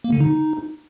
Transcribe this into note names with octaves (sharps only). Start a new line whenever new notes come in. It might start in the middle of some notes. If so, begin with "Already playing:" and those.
A#3
D3
D#4